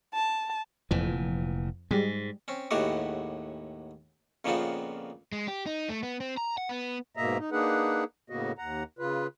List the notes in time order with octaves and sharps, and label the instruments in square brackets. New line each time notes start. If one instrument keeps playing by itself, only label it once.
[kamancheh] A5
[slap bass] F1 A#2 E3 [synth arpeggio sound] F2
[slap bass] G#2 [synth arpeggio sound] G3 G#3
[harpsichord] C4 C#4
D#2 A2 G#3 B3 F#4 G4
F2 A#2 C#3 F3 B3 C4
[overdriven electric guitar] G#3
G4
D#4
A3
B3
C4
A#5
F#5
B3
[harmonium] G#2 B2 A#3 D#5 E5 A#5
D#4
A#3 D4 D#4 G#4 B4 F#5
A2 C#3 A#3 B3 F#4 D#5
D#2 F#5 A#5
C#3 F4 B4